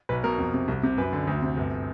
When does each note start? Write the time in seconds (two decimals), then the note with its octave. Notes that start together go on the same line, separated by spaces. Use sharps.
0.09 B1 B4
0.24 B2 A#4
0.38 F2
0.54 C3
0.68 C2
0.83 C3
0.98 F#2 B4
1.13 D3
1.27 D2
1.42 C3
1.57 G1